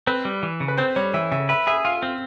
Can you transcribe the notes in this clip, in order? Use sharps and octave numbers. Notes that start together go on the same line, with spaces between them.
C4 B4
G3
E3
C#3
B4
C4 C5
G3 C#5
E3 E5
C#3 E5
B4 E5
G#4 E5
F4 F5
C4 F5